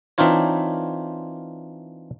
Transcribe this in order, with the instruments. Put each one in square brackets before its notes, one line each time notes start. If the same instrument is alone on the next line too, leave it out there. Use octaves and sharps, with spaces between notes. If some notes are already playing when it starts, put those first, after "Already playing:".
[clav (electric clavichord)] E3 C4 D4 D#4 F4 C#5